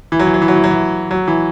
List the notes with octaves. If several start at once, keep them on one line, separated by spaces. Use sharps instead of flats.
E3
F#3
E3
F#3
E3
F#3
E3
F#3
E3
F#3
E3